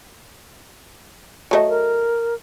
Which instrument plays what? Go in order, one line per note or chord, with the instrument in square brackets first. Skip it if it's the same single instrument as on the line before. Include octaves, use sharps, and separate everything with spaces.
[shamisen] F#3 A3 D#5
[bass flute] A#4